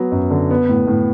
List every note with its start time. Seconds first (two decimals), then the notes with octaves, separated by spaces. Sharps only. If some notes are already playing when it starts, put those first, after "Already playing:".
Already playing: F#3 B3
0.12 F#2
0.31 D3
0.51 B3
0.69 A2
0.87 A2